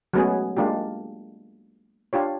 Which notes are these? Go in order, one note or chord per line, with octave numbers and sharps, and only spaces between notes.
F#3 G#3 A3 B3 C#4 G#4
G#3 A#3 D4 F4 G4
D4 F4 G4 C#5